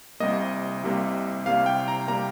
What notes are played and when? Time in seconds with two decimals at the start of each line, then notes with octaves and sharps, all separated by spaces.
0.20 C2 C3 G3 A#3 D#5
0.83 C2 C3 G3 A#3
1.45 C2 C3 G3 A#3 F5
1.66 G5
1.88 A#5
2.08 C3 G3 A#3 A#5